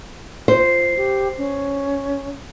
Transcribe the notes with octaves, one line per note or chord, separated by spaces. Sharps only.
F4 C5
G4
C#4